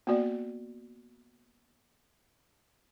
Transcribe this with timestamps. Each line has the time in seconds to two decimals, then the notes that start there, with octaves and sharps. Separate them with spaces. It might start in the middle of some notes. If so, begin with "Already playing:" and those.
0.07 A#3 B3 F#4 D5